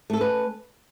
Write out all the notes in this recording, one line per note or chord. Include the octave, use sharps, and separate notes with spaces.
A3 C#4 A4 B4